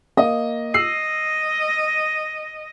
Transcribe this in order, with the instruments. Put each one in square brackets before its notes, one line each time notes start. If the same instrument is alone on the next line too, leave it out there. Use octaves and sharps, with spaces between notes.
[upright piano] A#3 D#5
[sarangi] D#5 [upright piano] E6 C7 F#7